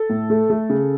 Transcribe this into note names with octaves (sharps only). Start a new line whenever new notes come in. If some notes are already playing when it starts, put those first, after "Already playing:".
Already playing: A4
A2
A3
A3
C#3